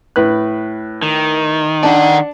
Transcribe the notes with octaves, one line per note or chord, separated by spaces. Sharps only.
A2 B4 F#6
D#3
D4 D5 F#5 A5